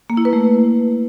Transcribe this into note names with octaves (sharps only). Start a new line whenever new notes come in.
A#3
E4
B4
A3